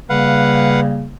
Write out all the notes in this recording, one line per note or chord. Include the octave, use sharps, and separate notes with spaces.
C#3 G3 A#3 B4 F5 F#5